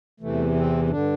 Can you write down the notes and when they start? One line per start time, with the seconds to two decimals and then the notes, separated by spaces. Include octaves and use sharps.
0.20 E2 C3 E3 A3
0.56 C4
0.90 G2 D3 D4